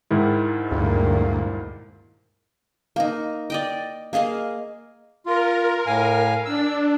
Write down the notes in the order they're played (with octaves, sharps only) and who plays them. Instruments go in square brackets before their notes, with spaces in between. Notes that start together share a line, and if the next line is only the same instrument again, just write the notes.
[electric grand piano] G#2 D#3 E4
[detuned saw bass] D2 [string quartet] G2 A#2 A#3
[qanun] A#3 D#4
D5 D#5 G5
A#3 G#4 D#5 F5
[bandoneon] F4 [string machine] A#4
[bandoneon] A2 F5 G#5
[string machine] D4 [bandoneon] E6